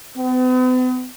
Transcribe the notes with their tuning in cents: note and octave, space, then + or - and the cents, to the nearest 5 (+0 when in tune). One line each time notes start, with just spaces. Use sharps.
B3 +45